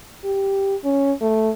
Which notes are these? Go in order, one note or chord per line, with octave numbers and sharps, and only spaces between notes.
G4
C#4
A3